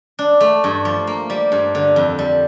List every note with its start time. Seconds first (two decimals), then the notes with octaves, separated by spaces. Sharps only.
0.19 D4
0.40 A3
0.64 G2
0.85 F3
1.07 A#3
1.30 G3
1.52 G2
1.75 D3
1.96 F2
2.19 G3